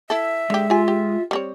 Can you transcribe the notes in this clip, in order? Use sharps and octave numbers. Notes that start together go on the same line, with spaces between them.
E4 A4 E5
D3 G#3 G4
F4 G4 G#5
G4
G3 C4 C#5